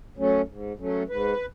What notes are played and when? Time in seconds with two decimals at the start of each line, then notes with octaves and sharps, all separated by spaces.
0.17 F#3 A3 C#4
0.48 G#2
0.79 F#3 A3 C#4
1.09 G#2 B4